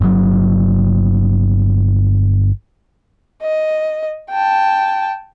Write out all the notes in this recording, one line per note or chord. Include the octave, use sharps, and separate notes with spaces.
G1 F#3
D#5
G5 A5